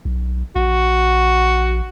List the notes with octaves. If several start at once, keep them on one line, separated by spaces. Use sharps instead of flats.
B1
A#1 F#4